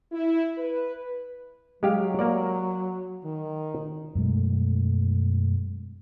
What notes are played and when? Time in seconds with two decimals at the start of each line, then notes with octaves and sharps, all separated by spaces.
0.12 E4
0.58 B4
1.83 F#3 G#3 G4 F5
2.19 A#3 A#4 D5
3.24 D#3
4.15 F#2 B2 G#3 A3